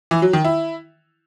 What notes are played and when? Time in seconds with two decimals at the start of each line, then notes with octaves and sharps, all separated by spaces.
0.11 E3
0.22 F#3
0.33 D#3
0.44 E4